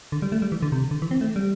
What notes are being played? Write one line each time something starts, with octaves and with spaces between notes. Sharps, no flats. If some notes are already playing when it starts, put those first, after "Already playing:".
D3
G3
A3
G3
E3
D3
C3
D3
E3
C4
A3
G3